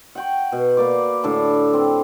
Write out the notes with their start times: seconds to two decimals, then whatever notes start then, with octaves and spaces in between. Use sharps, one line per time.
0.15 F#5 G5 C#6
0.52 B2
0.77 A#3 B4 D5 D6
1.23 A2 D3 A5 D6
1.73 C4